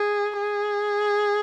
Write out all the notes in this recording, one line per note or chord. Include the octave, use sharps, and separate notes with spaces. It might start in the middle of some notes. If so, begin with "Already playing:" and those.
Already playing: G#4
G#4